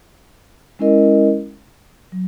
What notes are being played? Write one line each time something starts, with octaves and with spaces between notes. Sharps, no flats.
G#3 C#4 E4 A#4 D#5
F#3